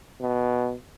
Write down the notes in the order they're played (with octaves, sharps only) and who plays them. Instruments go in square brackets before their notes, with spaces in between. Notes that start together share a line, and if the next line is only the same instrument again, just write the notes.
[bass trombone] B2